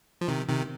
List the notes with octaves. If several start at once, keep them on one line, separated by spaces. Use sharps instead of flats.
F3
C3 D#3
C3 D#3